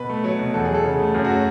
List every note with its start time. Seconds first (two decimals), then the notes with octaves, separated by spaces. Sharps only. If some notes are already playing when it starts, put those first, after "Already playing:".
Already playing: B2 B4
0.10 A3
0.24 F#3
0.39 B2
0.54 E2 A4
0.65 G#4
0.69 F#3
0.74 A4
0.84 C#3
0.99 A3
1.14 F#2 G#4
1.25 F#4
1.30 A3 C#4